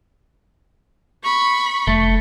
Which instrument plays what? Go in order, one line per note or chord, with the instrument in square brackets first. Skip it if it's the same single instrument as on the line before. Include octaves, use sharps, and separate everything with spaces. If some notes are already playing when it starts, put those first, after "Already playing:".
[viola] B5 C#6
[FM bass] F1 [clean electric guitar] A3